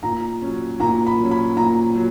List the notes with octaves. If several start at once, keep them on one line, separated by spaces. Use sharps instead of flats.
A#2 A#5
F#3 C#4
A#2 A#5
B5
F#3 C#4
B5
A#2 A#5
F#3